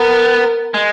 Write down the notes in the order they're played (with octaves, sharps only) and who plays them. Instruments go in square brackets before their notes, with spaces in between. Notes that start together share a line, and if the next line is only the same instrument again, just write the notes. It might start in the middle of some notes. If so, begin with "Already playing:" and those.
Already playing: [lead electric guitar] B3 [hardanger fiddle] A#4
[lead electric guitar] G#3